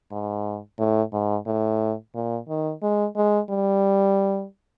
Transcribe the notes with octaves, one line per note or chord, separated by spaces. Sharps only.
G#2
A2
G#2
A2
A#2
D#3
G#3
G#3
G3